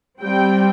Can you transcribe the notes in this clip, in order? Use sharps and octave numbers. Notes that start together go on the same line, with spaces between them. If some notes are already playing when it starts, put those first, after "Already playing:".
G3 C4 G5